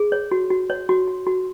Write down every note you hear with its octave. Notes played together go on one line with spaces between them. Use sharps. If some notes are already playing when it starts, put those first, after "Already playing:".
Already playing: G#4
C#5
F#4
F#4
C#5
F#4
F#4
F#4